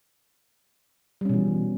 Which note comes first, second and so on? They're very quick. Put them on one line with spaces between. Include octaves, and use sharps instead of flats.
G3 C#4 B2 E3